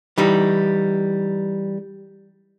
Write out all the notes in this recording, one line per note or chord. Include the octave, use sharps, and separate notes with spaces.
E3 G3 D#4